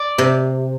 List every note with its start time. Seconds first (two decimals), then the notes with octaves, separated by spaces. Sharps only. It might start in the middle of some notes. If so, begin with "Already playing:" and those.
Already playing: D5
0.18 C3